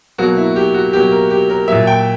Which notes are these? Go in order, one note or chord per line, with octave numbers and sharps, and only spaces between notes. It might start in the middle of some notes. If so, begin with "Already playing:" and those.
B2 F#3 A#3 F#4
E4
G4
F#4
B2 F#3 A#3 G4
A#4
G4
A#4
A#2 F#3 A#3 E5
G5